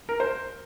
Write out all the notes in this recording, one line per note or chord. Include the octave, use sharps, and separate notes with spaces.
A#4
C5